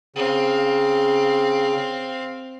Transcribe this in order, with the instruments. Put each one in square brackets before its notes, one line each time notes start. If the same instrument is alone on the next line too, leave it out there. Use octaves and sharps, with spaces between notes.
[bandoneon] C#3 [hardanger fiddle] C4 F5